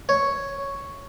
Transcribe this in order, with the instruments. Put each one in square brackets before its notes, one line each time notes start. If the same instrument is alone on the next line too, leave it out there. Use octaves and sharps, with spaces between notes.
[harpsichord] C#5